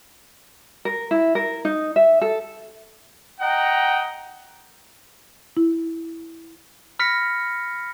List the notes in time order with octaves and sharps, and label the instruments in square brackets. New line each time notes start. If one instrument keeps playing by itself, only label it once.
[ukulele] A#4
E4
A#4
D#4
E5
A4
[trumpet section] D#5 F#5 G5 A#5
[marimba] E4
[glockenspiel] B5 F6 A#6 B6 C#7